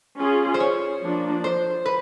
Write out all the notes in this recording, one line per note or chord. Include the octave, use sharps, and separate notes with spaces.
C#4 F4 G#4
C5
C#5
F3 A#3 D4
C5
B4